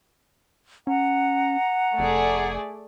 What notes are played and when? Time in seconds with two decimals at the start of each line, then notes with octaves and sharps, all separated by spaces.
0.87 C#4 F#5 A#5
1.99 F1 A3 G#4 D5